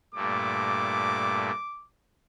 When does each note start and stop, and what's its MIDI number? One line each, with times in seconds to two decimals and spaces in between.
0.15 1.51 43
0.15 1.51 46
0.15 1.51 57
0.15 1.85 86